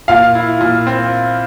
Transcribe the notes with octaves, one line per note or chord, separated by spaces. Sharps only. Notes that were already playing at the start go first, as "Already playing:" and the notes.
A#2 F5
E4
A#2
C4